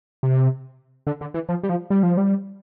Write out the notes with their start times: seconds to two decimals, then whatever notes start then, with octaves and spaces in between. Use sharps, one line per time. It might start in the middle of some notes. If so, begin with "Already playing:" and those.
0.23 C3
1.07 D3
1.21 D3
1.34 E3
1.49 F3
1.63 G3
1.69 F3
1.90 G3
2.03 F3
2.17 G3